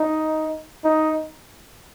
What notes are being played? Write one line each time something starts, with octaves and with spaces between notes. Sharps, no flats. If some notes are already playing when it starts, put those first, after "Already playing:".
Already playing: D#4
D#4